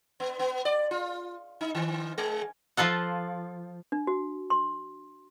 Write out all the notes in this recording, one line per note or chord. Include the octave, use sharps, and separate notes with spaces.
B3
B3
D5
F4
D#4
D#3
G#3
F3 F4 A4 F#5
D4
F#4
C6